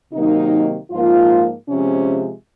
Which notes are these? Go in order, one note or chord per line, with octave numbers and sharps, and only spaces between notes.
C3 D#3 F#3 A#3 D#4
G#2 F3 A#3 F4
C3 F3 G#3 C#4